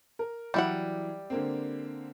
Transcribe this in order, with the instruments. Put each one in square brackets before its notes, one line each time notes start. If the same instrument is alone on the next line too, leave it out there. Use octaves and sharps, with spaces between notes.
[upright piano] A#4
[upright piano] E3 F#3 [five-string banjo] G3 E4 F#5
[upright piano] D3 A#3 C4